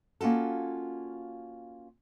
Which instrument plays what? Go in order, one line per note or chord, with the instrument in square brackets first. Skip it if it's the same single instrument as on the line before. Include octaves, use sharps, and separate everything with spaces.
[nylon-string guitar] A#3 C#4 F4 F#4 A4